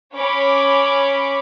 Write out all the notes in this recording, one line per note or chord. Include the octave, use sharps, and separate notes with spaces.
C#4 C#5 B5 D6